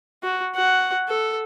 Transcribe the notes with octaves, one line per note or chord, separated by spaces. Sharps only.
F#4
F#4 F#5
A4